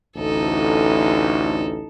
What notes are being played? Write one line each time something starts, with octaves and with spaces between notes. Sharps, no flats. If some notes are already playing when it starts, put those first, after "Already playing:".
A1 D2 D#4 A4